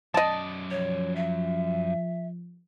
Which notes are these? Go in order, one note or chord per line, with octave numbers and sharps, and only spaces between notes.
F#2 D5 D#5 A5
F3 C#5
E5